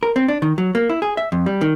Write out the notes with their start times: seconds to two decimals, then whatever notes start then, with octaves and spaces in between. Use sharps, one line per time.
0.03 A#4
0.16 C4
0.28 D4
0.42 D#3
0.58 F#3
0.75 A#3
0.89 E4
1.02 G#4
1.17 E5
1.32 F2
1.46 G3
1.61 D#3